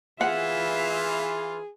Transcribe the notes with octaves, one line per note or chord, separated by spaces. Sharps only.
E3 F4 G#4 E5 F#5